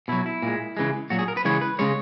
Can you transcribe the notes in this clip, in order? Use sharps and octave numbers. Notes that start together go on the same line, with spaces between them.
B2 F#3 E4
E4
A#2 G#3
C#3 E3 G#3
A#2 F#3 F#4
G#4
A#4
B4
C#3 E3 G#3 C#5
B4
C#3 G#3 C#5